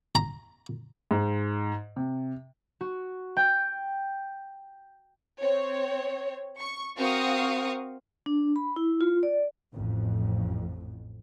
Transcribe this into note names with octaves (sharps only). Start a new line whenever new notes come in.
A#5
G#2
C3
F#4
G5
C4 C#5
C#6
C4 F#4 A#4 F5 C#6 D#6
D4
B5
E4
F4
D5
A1 F2